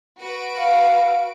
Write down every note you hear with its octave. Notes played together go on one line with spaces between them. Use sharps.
F#4 B4 D7
F5